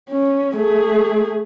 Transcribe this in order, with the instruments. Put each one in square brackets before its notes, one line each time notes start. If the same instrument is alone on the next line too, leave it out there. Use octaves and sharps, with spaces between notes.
[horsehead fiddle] C#4
A3 G#4